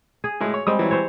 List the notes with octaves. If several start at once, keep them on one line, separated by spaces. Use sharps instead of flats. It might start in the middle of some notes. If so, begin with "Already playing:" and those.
G#4
A2 G#3
C#5
G3 G#3 C4 D#6
E3 F#3
C5 C#5